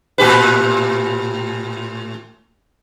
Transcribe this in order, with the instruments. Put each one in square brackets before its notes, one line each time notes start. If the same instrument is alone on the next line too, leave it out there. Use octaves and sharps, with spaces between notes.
[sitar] A2 G4 B4